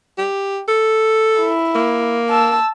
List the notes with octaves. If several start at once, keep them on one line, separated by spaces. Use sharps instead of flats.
G4
A4
E4
A#3
A5 E6